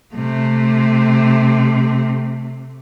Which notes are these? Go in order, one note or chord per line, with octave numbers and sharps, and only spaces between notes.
C3 A3